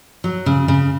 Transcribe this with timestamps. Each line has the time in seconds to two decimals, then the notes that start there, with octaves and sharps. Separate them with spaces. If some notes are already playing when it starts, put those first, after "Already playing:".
0.24 F#3
0.46 C#3
0.68 C#3